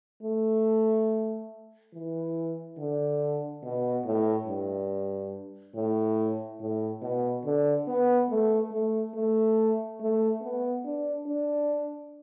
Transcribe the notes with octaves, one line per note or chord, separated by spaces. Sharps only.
A3
E3
D3
B2
A2
G2
A2
A2
B2
D3
B3
A3
A3
A3
A3
B3
D4
D4